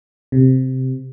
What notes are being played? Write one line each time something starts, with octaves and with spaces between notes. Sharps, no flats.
C3